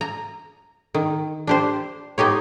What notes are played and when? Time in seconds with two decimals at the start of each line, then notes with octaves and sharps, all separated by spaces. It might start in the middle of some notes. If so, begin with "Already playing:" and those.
0.01 A#5
0.94 D#3
1.47 D4 G4 C5
2.18 B3 D#4 G4 C#5